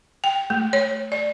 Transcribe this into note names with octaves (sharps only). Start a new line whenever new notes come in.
G5
A3
C#5
D5